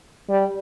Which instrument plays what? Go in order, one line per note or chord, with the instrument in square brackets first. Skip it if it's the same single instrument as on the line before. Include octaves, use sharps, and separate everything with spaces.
[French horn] G3